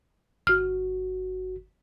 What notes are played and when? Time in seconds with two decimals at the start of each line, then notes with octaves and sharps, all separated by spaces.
0.47 G1 F#4 F6